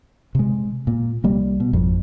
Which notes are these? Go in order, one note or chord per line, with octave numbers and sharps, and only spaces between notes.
C3 G#3
A#2
C2 G3 A#3
B2
G#1 F2